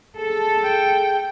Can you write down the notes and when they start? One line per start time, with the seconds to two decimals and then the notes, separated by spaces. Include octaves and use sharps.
0.18 G#4 A4
0.63 G5